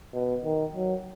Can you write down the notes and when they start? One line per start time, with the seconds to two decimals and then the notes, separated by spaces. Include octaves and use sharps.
0.14 B2
0.44 D#3
0.74 F#3